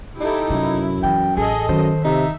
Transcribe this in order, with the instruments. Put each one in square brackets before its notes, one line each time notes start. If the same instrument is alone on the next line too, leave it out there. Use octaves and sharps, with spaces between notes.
[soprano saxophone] D#4 [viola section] E4 G4 A4
[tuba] F#2 [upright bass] C3 [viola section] E4
[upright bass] E3 [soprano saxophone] G5
[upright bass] A1 [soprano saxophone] G#4 [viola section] A4 D#5
[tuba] F#2 [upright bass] D#3 [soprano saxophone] C5
[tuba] C3 [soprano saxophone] D#4 [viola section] E5